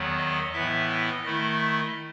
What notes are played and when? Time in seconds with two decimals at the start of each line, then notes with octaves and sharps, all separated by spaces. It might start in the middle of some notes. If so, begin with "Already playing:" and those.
Already playing: E2 D#3 F#3 B3
0.18 D#5
0.53 A2 E3 B3 E4 E5
0.89 D#5
1.24 D#3 A3 E4 D#5